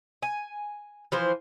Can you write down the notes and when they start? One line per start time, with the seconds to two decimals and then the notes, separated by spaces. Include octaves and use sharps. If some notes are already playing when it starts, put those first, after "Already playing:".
0.22 G#5
1.12 E3 F3 C5